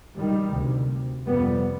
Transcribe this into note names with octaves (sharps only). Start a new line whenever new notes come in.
D#3 G3
D2 C3
F2 C3 G3 B3